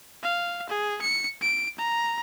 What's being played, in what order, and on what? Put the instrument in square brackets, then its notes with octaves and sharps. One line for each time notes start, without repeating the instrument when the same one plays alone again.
[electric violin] F5
G#4
C#7
D7
A#5